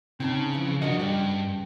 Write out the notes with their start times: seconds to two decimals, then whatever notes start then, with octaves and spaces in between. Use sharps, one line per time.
0.20 C#3 C4 D#4 A5
0.53 F2 E3
0.82 F3 D4 F#4 A#4 D#5
0.99 G2 C#3 G4